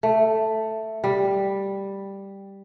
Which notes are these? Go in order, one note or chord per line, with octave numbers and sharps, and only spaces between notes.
A3
G3